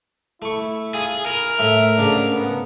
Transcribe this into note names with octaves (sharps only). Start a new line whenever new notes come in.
A3 E4 C#6
F4 G#4 G#5
A#4 G#5 B5
A2 A3 E5
G#2 C#3 A3 D4
B3